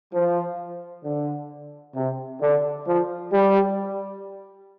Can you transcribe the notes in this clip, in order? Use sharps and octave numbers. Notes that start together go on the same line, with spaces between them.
F3
D3
C3
D3
F3
G3